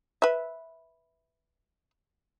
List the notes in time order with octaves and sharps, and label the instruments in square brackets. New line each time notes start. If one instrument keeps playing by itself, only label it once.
[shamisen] B4 E5